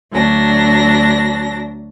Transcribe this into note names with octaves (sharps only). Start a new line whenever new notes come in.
D2 F#3 D4 A#6